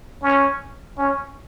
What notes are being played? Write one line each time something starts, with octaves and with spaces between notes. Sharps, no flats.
C#4
C#4